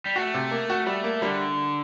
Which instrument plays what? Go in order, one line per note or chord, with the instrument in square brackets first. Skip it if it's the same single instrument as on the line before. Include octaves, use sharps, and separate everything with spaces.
[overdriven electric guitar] G3
[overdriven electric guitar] A3 [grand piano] F#4
[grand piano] C3
A#3
F#4
[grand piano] G3 [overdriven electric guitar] A3
[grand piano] A#3
[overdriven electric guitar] D3 [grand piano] G3